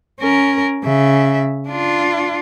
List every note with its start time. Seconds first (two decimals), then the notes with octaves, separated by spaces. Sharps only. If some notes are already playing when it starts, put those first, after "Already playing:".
0.20 C#4 A#4
0.84 C#3 E5
1.69 D4 F4